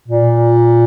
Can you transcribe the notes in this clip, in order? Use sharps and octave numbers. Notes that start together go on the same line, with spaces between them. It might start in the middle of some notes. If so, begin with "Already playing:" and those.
A#2